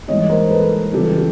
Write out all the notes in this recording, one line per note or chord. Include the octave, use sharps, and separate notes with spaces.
G#2 E3 G3 A#3 C#5 D#5
A#4 C5
A4 B4
F2 C#3 E3 G3 G4 A4